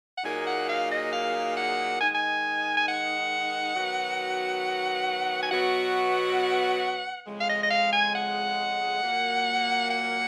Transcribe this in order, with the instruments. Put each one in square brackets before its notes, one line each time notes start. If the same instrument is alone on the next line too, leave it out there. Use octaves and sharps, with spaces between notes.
[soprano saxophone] F#5
[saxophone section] A#2 F#3 A#3 D#4 G#4 [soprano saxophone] G#5
[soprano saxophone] F#5
F5
D#5
F5
F#5
[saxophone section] D#3 G#3 D#4 [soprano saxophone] G#5
[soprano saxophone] G#5
G#5
F#5
[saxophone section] D#3 F#3 B3 F#4
[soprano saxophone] G#5
[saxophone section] B2 F#3 B3 F#4 [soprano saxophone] F#5
[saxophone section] F2 C#3 G#3
[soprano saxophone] F5
D#5
D#5
F5
G#5
F#5
[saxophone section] A#2 F#3 A#3
[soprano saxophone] F#5